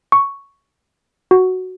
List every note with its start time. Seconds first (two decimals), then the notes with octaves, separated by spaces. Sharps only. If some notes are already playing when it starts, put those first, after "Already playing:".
0.12 C#6
1.31 F#4